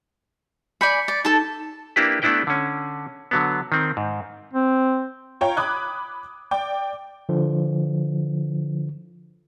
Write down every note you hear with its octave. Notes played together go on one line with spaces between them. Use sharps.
D5 G#5 B5 G6 B6 C#7
D5
D#4 A4 A5
A#3 D4 E4 G4 B4
A3 B3 D4 E4 B4 G5
D3 C#4
D3 F#3 B3
D#3 C4
G#2
C4
F4 C#5 G5 A#5
B5 D6 D#6 F#6 G#6
D5 G5 D6
D3 F3